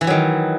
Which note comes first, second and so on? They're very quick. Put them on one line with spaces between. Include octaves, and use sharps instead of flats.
E3 E4 F#3 D#3